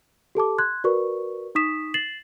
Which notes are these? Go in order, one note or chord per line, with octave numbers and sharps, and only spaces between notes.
G4 A4 A5 D6
C6 F#6 G#6
F#4 A#4 B4 D5 C#6
D#4 C#6 D#6 B6 E7
A6 C7 E7 F#7